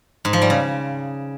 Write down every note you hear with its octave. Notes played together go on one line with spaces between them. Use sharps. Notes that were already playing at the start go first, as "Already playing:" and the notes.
G#2
F3
G3
C#3